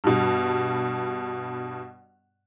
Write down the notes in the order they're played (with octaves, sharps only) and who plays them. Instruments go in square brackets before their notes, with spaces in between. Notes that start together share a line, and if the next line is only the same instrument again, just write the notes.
[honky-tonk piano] G2 B2